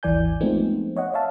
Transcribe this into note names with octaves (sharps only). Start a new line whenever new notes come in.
G#1 D#2 E3 D5 G#5 G6
F3 G#3 A3 B3 C4 D#4
C#5 D#5 F#5
C#5 E5 F5 A5